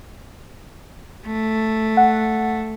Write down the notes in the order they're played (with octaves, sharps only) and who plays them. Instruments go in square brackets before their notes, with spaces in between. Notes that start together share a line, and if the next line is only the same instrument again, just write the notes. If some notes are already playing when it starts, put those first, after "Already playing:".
[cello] A3
[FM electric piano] F#5